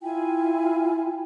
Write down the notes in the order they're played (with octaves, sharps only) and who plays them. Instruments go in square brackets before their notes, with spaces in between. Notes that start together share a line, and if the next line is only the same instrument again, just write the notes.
[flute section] E4 F4 G5 G#5